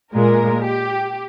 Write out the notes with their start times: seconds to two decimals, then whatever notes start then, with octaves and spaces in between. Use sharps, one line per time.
0.13 A#2 G#3 A#4
0.64 G4